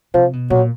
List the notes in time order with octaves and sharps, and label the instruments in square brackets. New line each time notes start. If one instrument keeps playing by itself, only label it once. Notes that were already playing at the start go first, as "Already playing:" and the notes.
[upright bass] C3 [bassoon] F3
[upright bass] B2
[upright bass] A#2 [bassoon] F#3